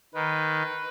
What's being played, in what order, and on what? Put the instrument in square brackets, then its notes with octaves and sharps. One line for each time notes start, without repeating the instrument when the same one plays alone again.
[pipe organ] D#3 [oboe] B4